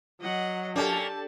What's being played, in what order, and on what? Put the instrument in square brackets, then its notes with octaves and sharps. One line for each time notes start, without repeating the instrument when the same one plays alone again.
[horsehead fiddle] F#3 [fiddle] D#5 F#5
[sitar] A#3 C#4 [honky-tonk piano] D4 G4 A4 [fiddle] A5